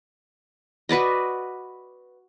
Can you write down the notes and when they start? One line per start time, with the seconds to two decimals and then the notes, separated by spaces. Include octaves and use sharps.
0.89 F#4 B4 D5 D#5